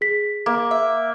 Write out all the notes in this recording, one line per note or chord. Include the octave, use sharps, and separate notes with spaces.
G#4 B6
A#3
E5